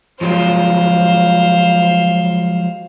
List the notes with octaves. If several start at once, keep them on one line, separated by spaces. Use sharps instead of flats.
F3 F#3 G#3 C5 F5